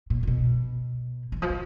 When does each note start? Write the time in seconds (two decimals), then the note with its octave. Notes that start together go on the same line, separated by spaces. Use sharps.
0.10 A#2
0.23 A#2
0.27 B2
1.32 E3
1.42 F3
1.50 E3